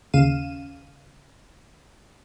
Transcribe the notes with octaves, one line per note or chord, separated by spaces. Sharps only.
D#2 C#3 F5 D#7 E7